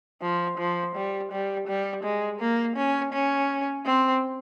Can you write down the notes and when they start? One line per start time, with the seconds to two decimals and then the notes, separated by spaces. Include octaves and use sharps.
0.22 F3
0.58 F3
0.95 G3
1.32 G3
1.68 G3
2.03 G#3
2.40 A#3
2.76 C#4
3.13 C#4
3.86 C4